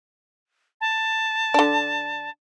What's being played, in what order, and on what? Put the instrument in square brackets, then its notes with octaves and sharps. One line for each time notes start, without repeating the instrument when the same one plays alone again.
[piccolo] A5
[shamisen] D3 D4